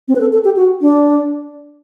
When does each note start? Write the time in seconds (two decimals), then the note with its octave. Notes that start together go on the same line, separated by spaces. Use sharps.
0.08 C4
0.16 B4
0.21 A4
0.33 A4
0.45 G4
0.57 F#4
0.81 D4